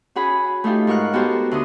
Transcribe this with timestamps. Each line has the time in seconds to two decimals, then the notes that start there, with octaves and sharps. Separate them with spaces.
0.15 C#4 F#4 G#4 F#5 B5
0.64 A3 D#4 F4 G4
0.87 G#2 A#4 C#6 F6 F#6
1.13 B3 F#4 G4 A4 A#4 C5
1.51 D2 D3 D4 D#6